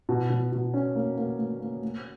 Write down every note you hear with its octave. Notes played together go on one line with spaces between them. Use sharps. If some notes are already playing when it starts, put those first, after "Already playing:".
B2
B2
B2
C#4
A#3
A#3
A#3
A#3
A#3